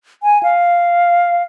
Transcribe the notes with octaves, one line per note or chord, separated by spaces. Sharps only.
G#5
F5